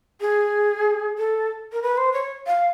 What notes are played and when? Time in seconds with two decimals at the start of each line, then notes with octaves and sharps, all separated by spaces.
0.21 G#4
1.18 A4
1.73 A#4
1.82 B4
1.97 C5
2.13 C#5
2.47 F5